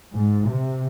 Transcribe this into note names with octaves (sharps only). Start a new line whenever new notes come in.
G#2
C3